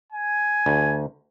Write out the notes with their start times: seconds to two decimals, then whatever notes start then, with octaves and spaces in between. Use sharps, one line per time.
0.12 G#5
0.66 D2